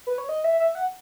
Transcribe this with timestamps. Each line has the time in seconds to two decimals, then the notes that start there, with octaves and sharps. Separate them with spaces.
0.07 B4
0.18 C#5
0.29 D#5
0.44 E5
0.60 E5
0.75 F#5